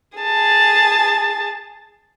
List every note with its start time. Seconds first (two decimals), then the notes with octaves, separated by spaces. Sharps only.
0.18 G#4 A5